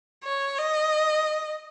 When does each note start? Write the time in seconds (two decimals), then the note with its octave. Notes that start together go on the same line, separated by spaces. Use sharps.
0.24 C#5
0.58 D#5